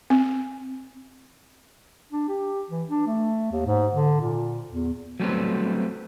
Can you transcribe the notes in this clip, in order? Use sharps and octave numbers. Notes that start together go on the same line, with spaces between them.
C4
D4
G4
E3
D4
A3
D#2
G#2
D3
A#2
E2
F#3 G3 A3 B3 C4